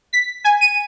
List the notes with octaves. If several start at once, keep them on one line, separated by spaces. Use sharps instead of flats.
B6
G#5
D#7